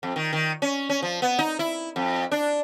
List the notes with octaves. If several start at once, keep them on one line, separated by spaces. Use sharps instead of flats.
F2
D#3
D#3
C#4
C#4
F3
B3
D#4
E4
F2
D4